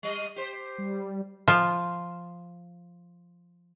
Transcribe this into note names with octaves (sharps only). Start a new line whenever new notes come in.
G3 D#5
G4 C5
G3
F3 F4